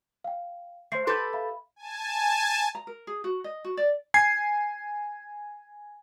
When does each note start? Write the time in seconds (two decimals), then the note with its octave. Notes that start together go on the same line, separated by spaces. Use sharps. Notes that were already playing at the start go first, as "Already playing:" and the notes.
0.24 F5 G5
0.92 A3 C5 C6 C7
1.07 G4 A4 B4 C6 G6
1.33 E5 F5 B5
1.76 G#5 A5
2.75 A#5
2.87 A#4
3.07 G#4
3.24 F#4
3.44 D#5
3.64 F#4
3.77 D5
4.14 G#5 G#6 C7